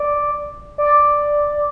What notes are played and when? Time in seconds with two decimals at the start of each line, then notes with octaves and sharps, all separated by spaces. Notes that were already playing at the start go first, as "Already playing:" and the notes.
Already playing: D5
0.78 D5